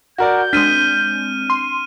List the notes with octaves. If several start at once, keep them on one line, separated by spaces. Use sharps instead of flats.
F#4 A#4 D5 G6
G#3 C4 D4 F6 B6 D#7
C6